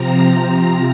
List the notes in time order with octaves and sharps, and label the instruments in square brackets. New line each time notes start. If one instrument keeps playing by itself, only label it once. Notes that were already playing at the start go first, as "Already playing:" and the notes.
Already playing: [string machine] C3 F3 C4 A#5